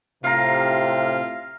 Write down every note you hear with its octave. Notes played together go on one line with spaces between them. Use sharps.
A2 C3 F4 F5 A#5